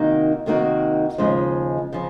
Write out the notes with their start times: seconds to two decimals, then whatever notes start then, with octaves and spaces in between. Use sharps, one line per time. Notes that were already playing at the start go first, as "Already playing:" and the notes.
Already playing: C3 D#3 A#3 D#4 F#4
0.46 C3 D#3 A#3 D#4 F#4
1.18 D#2 C#3 F3 G#3
1.93 C#3 F3